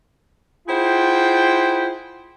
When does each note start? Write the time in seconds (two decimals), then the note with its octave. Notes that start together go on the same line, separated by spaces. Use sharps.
0.68 E4 F4 G#4 C5 F#5 G5